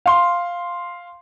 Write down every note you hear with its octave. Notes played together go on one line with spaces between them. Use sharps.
F5 C6